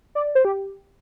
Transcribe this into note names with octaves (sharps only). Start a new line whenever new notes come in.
D5
C5
G4